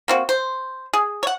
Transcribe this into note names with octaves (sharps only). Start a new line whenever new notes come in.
A#3 C4 F#4
C5
G#4
C#5 F#5